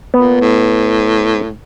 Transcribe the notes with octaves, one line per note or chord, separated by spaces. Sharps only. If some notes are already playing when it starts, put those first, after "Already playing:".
A#2 B3
A2